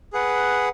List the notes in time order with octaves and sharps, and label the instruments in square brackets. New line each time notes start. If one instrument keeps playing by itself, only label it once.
[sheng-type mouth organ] G#4 B4 F#5